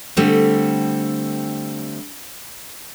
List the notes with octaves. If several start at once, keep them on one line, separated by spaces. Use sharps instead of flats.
D3 G3 A3 C4